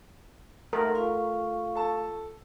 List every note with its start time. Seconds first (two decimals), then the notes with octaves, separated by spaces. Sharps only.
0.73 A3 A#4 F#5 C6
0.95 F4 F5 C#6
1.75 A4 A5